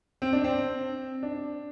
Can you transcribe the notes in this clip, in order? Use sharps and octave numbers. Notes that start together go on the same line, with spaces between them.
C4
D4
C4
D4